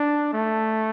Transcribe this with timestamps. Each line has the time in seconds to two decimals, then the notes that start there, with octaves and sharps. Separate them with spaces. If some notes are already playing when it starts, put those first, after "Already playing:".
Already playing: D4
0.33 A3